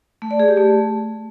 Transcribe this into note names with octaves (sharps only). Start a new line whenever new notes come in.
A3
D5
G#4
G4
A3